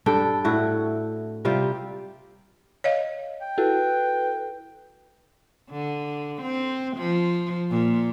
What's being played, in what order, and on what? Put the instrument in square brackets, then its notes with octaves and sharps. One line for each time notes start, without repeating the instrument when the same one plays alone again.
[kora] G2 D4 A4 G5
A2 E4 F#4
C3 G3 F4 G4
[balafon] C#5 D#5 F5
[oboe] G5
[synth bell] E4 F#4 A4 [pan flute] B4
[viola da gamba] D3
C4
F3
A#2